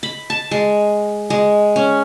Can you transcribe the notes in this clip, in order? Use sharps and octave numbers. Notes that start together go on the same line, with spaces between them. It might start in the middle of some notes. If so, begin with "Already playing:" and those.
B5
A5
G#3
G#3
C#4